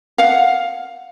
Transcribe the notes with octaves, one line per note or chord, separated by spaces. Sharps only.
F5 F#5